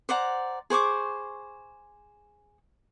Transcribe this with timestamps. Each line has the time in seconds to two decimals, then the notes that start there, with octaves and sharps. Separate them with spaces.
0.09 C5 D5 F#5 A#5
0.70 G#4 C5 C#6 D6